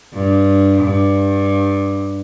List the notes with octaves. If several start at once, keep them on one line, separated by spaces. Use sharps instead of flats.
G2
G2